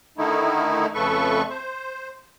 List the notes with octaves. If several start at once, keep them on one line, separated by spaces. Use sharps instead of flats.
D3 D#3 A3 D#4 E4
F2 C#3 A3 A4 B4 C#6
C5